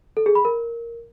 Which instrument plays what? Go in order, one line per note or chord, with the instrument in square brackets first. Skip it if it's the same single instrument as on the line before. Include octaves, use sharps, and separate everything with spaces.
[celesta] A4
G#4
B5
A#4